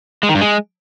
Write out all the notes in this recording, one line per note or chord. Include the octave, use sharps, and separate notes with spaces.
G#3
D#3
G2
G#3